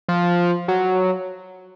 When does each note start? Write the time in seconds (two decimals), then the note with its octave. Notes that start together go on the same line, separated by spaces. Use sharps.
0.08 F3
0.68 F#3